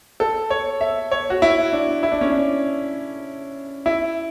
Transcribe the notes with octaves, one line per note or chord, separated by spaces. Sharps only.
A4
C#5
E5
C#5
F#4
E4
D4
E4
D4
C#4
D4
E4